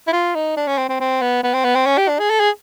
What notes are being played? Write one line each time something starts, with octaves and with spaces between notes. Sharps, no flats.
E4
F4
D#4
D4
C#4
C4
C4
C4
B3
B3
C4
B3
C4
C#4
G4
D4
G#4
A4
G#4